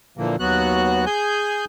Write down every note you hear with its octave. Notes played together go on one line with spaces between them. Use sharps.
A#2 D3 E3 F3 A#3
D#2 F#3 B3 F#4 F#6
G#4 G#5 G6